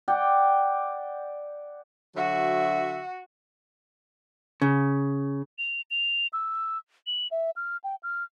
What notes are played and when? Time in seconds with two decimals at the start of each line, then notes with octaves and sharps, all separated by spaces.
0.08 D5 F#5 G5
2.16 D3 F#3 F#4 E5
4.62 C#3
5.58 F7
5.90 F7
6.33 E6
7.07 F#7
7.31 E5
7.56 F6
7.84 G5
8.03 F6